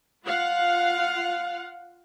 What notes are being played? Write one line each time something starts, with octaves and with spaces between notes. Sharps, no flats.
F4 F5 F#5